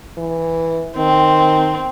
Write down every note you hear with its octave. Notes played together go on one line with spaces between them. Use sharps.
E3
D#3 C4